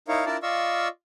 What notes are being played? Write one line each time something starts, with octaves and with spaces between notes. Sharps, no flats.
D#4 E4 A#4 C#5 F5
D4 E4 F4 A#4 D5 A5
F4 D5 D#5 F5 C#6 E6